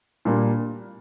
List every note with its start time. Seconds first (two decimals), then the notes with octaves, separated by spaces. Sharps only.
0.25 A#2 G3 A#3 D4